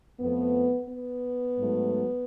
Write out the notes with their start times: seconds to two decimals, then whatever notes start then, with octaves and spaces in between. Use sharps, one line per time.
0.20 F2 F3 A3 B3
0.89 B3
1.57 G#2 F#3 A3